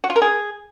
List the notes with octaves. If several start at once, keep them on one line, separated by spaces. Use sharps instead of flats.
F#4
F4
A#4
G#4